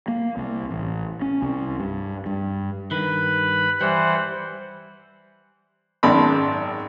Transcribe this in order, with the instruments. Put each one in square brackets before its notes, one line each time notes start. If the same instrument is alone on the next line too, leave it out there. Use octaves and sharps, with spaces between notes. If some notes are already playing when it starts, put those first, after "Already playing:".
[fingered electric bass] A#3
C2
A1
C#4
C2
G2
G2
[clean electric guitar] G2 D#3 [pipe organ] B4 B5
[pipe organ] E3 C5 F#5 [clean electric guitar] G3
[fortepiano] G#1 F#2 D5 A5 B5 C6